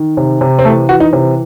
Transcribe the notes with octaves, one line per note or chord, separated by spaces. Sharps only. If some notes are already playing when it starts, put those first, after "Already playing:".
Already playing: D#3
C3
C3
C4
E3 A3
E3 F#4
D#4
C3